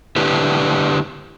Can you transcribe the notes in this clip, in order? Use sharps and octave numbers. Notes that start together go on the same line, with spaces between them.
D3 D4 E4 G4 B4